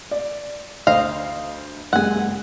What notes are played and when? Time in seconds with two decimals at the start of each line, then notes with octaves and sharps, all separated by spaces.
0.11 D5
0.87 D2 C5 D#5 F5
1.93 F#1 G#3 F#5 G#5